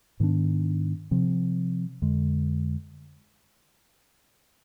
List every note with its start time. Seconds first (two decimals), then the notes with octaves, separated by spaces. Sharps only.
0.20 G#2 D#3 B3 D4
1.11 C3 F3 C4
2.02 F2 D3 G#3